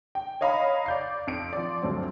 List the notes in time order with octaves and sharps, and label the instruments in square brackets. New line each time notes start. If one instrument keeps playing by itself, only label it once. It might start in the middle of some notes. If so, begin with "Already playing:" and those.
[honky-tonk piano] G5
C#5 D#5 F5 A#5 B5
D5 G6 C7
F2 C7 D7
F3 D5
D2 G2 F#3 C4